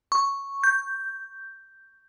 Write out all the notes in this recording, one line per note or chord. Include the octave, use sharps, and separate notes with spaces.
C#6
G6